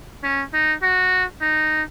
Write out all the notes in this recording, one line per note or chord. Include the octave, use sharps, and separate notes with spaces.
C#4
D#4
F#4
D#4